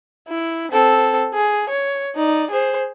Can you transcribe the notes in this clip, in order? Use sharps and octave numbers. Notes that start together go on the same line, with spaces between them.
E4
C4 A4
G#4
C#5
D#4 D5
G#4 C5